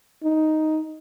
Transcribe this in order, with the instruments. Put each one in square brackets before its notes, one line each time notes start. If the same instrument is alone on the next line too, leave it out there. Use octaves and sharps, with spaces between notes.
[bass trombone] D#4